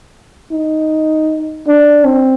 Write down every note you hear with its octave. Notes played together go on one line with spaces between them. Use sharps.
D#4
D4
C4